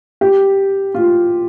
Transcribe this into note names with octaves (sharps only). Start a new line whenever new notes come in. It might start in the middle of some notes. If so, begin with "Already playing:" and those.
G4
F4